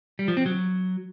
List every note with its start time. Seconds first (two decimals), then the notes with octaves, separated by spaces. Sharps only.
0.19 G3
0.28 F3
0.37 C4
0.46 F#3